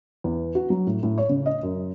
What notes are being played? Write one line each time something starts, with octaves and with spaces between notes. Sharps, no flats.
E2
F#4
F#3
A2
A2
C#5
C#3
D#5
F#2